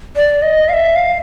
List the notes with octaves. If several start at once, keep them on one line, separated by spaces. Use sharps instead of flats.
D5
D#5
F5
E5
F5